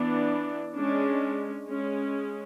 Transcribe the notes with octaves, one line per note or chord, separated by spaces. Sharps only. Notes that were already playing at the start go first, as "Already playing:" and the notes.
Already playing: E3 B3 D4
G#3 C#4 D4
G#3 C#4